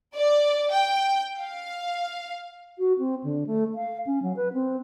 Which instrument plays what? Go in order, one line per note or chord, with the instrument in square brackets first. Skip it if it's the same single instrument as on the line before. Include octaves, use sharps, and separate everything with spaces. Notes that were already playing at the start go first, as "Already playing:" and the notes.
[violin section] D5
G5
F5
[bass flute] F#4
C4
D3
A3
F5
C#4
F#3
B4
C4